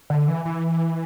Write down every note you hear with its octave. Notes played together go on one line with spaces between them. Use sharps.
D3
E3
E3